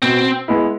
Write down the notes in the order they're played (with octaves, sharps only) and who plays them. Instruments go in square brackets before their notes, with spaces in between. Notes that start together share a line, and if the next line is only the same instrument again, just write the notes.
[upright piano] B2 [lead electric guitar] C4
[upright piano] G#3 B3 E4